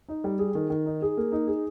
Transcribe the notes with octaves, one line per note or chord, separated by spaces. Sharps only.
D#4
G3
G#4
D#3
D#3
D#4
G#4
A#3
D#4
G#4